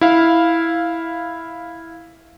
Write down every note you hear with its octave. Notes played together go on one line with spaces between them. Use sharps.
E4 F5